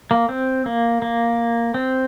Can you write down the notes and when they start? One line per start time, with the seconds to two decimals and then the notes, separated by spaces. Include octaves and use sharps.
0.11 A#3
0.29 C4
0.66 A#3
1.02 A#3
1.74 C4